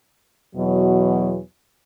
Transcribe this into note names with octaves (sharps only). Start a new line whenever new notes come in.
E2 B2 F#3